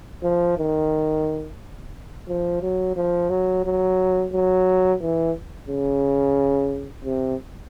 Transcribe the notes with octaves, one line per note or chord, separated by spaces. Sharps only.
F3
D#3
F3
F#3
F3
F#3
F#3
F#3
E3
C#3
C3